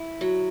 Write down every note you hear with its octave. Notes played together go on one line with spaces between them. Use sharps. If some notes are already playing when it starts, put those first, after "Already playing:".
Already playing: E4
F#3